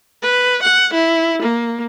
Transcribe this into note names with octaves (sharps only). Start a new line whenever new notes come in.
B4
F#5
E4
A#3